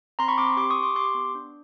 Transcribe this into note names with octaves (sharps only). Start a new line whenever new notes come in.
C4 A#5 C6
B5 C#6
C4 C6 D6
G4 C6 D6
C#6 D#6
G4
C6 D6
G4 C6 D6
B3
D4